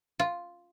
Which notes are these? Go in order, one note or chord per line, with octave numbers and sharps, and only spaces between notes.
F4